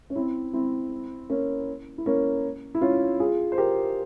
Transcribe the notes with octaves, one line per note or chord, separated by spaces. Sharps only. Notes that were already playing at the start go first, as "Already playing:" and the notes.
C#4
C4 E4
C4 E4
A#3 C#4
E4
A#3 C#4
E4
C#4 F4
F4 G#4
C5
G4 A#4